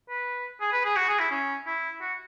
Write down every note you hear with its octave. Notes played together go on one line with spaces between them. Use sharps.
B4
G#4
B4
G#4
F#4
G#4
E4
C#4
E4
F#4